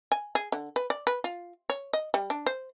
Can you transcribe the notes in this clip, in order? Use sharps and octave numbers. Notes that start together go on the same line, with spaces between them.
G#5
G#4
D3
B4
D5
B4
F4
C#5
D#5
G3
D4
C5